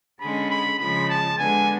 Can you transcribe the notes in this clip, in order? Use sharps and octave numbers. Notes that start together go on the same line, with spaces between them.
D3 G#3 C#4 B5
B5
C#3 F3 G#3 B5
A5
D3 G#3 B3 D4 G#5